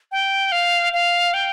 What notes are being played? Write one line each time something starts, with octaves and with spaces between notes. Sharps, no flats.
G5
F5
F5
G5